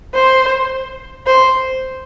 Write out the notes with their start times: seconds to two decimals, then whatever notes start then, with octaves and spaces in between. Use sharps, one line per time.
0.14 C5
1.27 C5